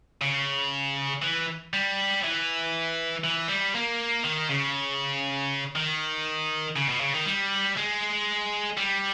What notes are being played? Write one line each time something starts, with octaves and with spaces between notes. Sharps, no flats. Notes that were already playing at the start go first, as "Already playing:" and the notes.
C#3
E3
G3
E3
E3
G3
A#3
D#3
C#3
D#3
C#3
B2
C#3
D#3
G3
G#3
G3